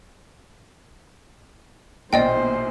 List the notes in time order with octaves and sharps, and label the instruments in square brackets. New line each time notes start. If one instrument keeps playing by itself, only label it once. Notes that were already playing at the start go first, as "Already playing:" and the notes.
[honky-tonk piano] A#1 B2 [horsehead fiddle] C5 [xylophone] D5 D#5 G5